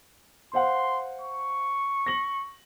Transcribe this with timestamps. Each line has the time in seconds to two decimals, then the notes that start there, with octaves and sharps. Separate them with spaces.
0.53 C5 F5 F#5 C6
1.21 C#6
2.06 A#6 F#7